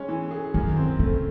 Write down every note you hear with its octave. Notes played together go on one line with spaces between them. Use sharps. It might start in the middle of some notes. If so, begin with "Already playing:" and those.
Already playing: G#3 C#4
E3
G#4
F#2 D#3
C4
C#3 A3